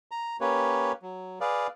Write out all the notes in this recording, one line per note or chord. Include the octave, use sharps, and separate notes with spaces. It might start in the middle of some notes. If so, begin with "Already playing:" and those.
A#5
A#3 C#4 G4 B4 C#5
F#3
G#4 B4 D5 F5